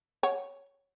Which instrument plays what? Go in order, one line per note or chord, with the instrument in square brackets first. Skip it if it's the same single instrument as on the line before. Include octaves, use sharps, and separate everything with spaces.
[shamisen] C#5 [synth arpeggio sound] F#5